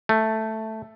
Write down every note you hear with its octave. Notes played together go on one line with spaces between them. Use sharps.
A3